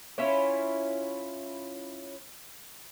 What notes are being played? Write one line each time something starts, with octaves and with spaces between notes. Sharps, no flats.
C#4 E4 F4 C#5